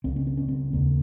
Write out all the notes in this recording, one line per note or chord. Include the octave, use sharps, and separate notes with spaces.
C#2 C#3 C4
C#4
C4
C#4
C4
D#2 C#3 A#3